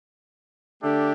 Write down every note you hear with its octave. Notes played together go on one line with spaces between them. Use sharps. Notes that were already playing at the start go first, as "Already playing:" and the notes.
D3 A3 D4 G4